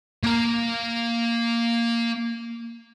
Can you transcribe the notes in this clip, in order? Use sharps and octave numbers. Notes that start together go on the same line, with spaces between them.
A#3 A#5